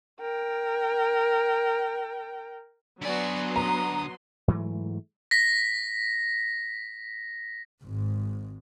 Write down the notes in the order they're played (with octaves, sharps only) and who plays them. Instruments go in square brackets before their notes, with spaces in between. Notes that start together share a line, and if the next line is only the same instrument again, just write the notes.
[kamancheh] A#4 G5
[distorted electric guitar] D3 G#5 [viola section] F#3 B3 C6 [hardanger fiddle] F#4 D5
[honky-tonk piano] A#5 [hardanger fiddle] D#6
[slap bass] G#2 E3 F#3 A3
[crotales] A#6 B6
[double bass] G#1 G#2